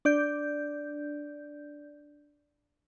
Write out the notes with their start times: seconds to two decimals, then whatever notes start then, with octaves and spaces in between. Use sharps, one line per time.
0.05 D4 D5 G6